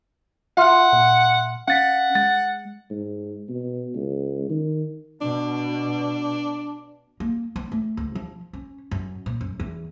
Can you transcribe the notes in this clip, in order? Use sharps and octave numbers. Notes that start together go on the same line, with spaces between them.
F4 E5 F#5 C6 F6
A#2
C#4 F5 F#5 A6 B6
G#3 A6
G#2
B2
C#2
D#3
B2 D4
A#3
B3
A3
D2
F3
C#4
F#2
A#2
F#2
E2